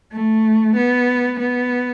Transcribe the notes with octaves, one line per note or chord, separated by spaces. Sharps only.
A3
B3
B3